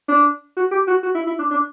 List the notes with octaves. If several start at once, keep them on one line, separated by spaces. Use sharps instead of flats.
D4
F#4
G4
F#4
F#4
E4
E4
D4
D4